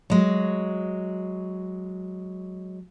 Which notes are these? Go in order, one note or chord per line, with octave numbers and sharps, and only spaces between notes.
F#3 G#3